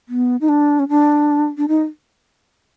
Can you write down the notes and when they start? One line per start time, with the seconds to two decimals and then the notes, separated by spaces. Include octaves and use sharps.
0.09 B3
0.41 D#4
0.49 D4
0.79 C#4
0.89 D4
1.58 D4
1.68 D#4